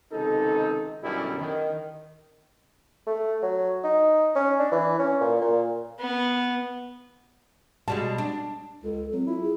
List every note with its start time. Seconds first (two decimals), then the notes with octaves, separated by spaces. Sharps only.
0.12 C#2 C3 D#3 D#4 A4
1.04 F#2 B2 D3 G3 C#4 E4
1.38 D#3
3.07 A3
3.42 F#3
3.84 D#4
4.35 C#4
4.59 D4
4.72 E3
4.99 C#4
5.21 A#2
5.41 A#2
5.99 B3
7.88 B2 G3 G#3 A5
8.18 D4
8.84 C#2 A4
9.12 F#3 C4
9.27 E4 F4
9.42 G#4